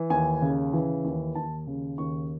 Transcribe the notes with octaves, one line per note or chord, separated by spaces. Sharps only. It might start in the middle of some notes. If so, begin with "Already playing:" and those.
Already playing: E3
D#2 G#5
C#3
E3
D#2
D#2 A5
C#3
D#2 C#6